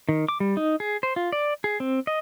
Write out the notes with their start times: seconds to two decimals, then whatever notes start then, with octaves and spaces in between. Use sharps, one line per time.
0.09 D#3
0.29 D6
0.40 G3
0.57 D#4
0.80 G#4
1.03 C5
1.16 F4
1.32 D5
1.64 G#4
1.80 C4
2.07 D#5